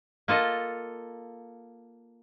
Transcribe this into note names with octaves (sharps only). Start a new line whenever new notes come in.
A#3 F4 A4 D#5